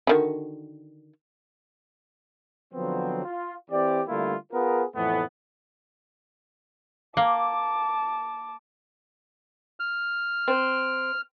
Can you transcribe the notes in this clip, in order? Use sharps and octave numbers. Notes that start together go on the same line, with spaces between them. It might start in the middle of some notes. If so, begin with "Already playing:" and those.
D3 D#3 F#4
D3 F3 F#3 B3 C4
F4
E3 C4 G4 D5
D3 G3 A3 A#3 E4 F4
B3 F4 G#4 A#4
F2 A2 E3 A3 B3
A#3 A5 D6
F6
C4